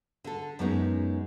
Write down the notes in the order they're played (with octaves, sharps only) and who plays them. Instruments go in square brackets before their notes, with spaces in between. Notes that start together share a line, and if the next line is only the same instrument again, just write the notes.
[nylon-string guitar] D3 A4
F#2 G#3 B3 C#4 D#4